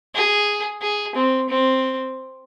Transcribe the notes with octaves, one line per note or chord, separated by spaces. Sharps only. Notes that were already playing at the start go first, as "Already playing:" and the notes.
G#4
G#4
C4
C4